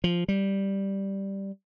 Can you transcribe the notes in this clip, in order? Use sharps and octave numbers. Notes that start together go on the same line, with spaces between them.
F3
G3